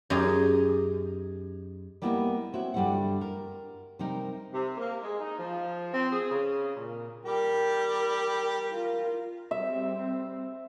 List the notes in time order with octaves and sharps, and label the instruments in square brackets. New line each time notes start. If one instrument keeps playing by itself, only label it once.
[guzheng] F#2 D#4 G4 G#4
[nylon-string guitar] G3 A#3 B3 E4 G4 D#5
C4 E4 F#4 C#5
G2 D3 G3 C#4 E4 F#5
A#4
C3 G3 D#4 A#4
[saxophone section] C3
A#3
G#3
D#4
F3
C4
G#4
C#3
A#2
[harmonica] G3 G4 G5 [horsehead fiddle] A#4
[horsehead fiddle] F4 A#4
[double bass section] G3 C4 [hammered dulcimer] E5